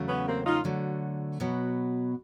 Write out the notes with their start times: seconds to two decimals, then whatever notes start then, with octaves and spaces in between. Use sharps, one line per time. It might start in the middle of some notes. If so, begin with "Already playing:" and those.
Already playing: E2 C#3 F#3 A3
0.08 B3 C#4
0.27 A#3 C4
0.45 D#4 F4
0.64 D2 D3 F#3 A3
1.40 B2 F#3 B3